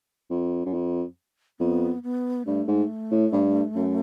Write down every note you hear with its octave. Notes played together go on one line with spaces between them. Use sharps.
F2
F#2
F2
F2 B3
B3
G2 A3
G#2
A2
G2
F#2